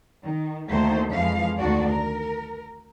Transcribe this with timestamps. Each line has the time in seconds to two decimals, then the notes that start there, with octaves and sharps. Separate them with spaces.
0.23 D#3
0.69 D2 D#3 A3 A#3 C5
1.12 F2 E3 F3 G#3 F5
1.58 D2 D#3 D4 F#4 D5
1.88 A#4